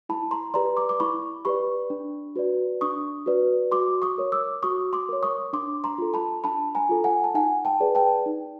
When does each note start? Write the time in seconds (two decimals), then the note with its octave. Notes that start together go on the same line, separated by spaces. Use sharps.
0.09 E4 A5 B5
0.31 A#5 C6
0.54 G4 B4 D5 A#5 C6
0.77 C6 D6
0.89 D6
1.00 E4 B5 C#6
1.45 G4 B4 D5 B5 C#6
1.90 D4
2.36 F#4 B4 D5
2.81 D4 C#6 D#6
3.26 F#4 B4 D5
3.72 F#4 C6 D6
4.02 C#6 D#6
4.18 A#4 C#5
4.32 D6 E6
4.63 F#4 C#6 D#6
4.93 C6 D6
5.09 A#4 C#5
5.23 C#6 D#6
5.53 D4 C6 D6
5.84 A#5 C6
5.98 F4 A4
6.14 A5 B5
6.44 D4 A5 B5
6.75 G#5 A#5
6.89 F4 A4
7.04 F#5 G#5
7.24 A5
7.34 D#4 F#5 G#5
7.65 G5 A5
7.80 G#4 B4 D5
7.95 G5 A5
8.26 D#4